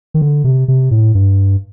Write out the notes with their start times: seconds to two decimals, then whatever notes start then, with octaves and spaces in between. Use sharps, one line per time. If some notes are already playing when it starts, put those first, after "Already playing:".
0.14 D#3
0.22 D3
0.44 C3
0.68 C3
0.91 A2
1.15 G2